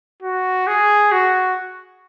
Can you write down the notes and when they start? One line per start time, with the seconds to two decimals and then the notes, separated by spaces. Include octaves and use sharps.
0.23 F#4
0.67 G#4
1.12 F#4